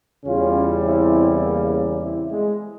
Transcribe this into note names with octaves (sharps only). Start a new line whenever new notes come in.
E2 C#3 G3 C#4 F4
C4 E4
A#3 C#4
C4 E4
G#3